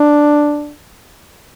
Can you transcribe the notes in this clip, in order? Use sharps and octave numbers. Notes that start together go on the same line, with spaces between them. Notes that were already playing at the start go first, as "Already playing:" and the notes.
Already playing: D4